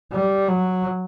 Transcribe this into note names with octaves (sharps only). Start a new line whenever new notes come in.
G3
F#3